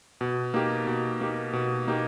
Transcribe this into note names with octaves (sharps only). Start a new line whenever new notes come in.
B2
A#3 D#4 G4
B2
A#3 D#4 G4
B2
A#3 D#4 G4